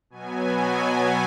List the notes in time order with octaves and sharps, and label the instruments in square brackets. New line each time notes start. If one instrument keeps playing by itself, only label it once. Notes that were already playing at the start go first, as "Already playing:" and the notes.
[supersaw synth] B2 F#3 B3 G#5